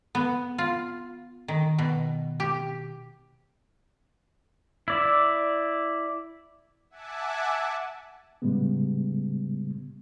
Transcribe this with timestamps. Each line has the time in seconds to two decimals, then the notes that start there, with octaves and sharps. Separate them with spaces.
0.15 B3
0.58 F4
1.48 D#3
1.79 B2
2.40 G4
4.88 E4 D5 E5
6.90 E5 F#5 G#5 A5 D6
8.42 A2 C#3 G3 G#3 B3